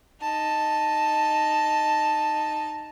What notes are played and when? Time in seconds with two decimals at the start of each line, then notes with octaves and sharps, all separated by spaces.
0.22 D#4 A5